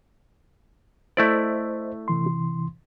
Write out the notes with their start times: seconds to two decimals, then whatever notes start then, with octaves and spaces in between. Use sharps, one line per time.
1.17 A3 E4 C5 D5 D#5
2.08 C3 E3 C6